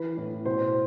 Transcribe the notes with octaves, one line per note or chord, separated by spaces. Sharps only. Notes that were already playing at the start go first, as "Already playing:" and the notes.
Already playing: E3 B4
A2
B2 C5